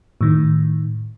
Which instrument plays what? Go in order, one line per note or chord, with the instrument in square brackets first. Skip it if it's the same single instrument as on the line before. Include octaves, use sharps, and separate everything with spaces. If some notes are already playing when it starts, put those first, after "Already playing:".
[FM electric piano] A2 D#3